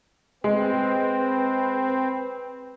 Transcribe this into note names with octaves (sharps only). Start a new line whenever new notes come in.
G#3 C4 B4